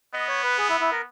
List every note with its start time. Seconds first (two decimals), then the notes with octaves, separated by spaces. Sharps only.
0.14 B3 D#5
0.28 C#5
0.43 B4
0.58 G#4
0.69 E4
0.80 E4
0.92 A#4